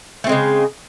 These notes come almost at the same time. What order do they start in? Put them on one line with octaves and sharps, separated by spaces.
A3 C4 G#3 C#3